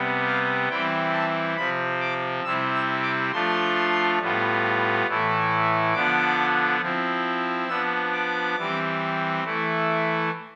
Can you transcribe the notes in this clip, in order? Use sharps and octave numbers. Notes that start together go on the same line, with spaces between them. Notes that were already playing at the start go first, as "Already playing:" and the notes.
Already playing: C3 G3 B3
F5
E3 G3 C4 E4 G5
A5
C3 F3 C4 B5
D6
C3 G3 C4 E4 E6
E6
D6
F3 A3 D4 F4 C6
A2 G3 B3 F4
A2 E3 A3 E4
D3 F3 B3 D4 D6
F3 C4 E4
F3 B3 D4 E6
D6
E3 G3 C4
E3 A3 E4